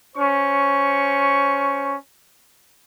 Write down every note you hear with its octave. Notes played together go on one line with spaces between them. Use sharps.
C#4 C5 C#6